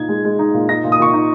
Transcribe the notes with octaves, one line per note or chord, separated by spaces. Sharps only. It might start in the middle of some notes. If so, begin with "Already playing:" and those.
Already playing: A#2 D#4 G#6
G#3
G#3
D#4
A#2
D#4 A#6
A#2
D#6
A#2 C#6
D#4